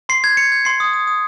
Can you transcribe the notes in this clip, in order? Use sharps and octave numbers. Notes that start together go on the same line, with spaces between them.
C6 C7
G6 G#6
G6 C#7
G6
C6 C7
D#6
D#6
D#6